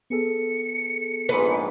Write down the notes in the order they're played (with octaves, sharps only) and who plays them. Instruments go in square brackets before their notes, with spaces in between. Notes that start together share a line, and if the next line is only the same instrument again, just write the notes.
[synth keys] B3 G#4 A4 [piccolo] C#7
[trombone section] A#1 G#2 [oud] B4